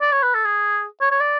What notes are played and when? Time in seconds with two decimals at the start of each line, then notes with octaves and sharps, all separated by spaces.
0.01 D5
0.12 C#5
0.23 B4
0.34 A4
0.45 G#4
1.01 C#5
1.11 C#5
1.20 D5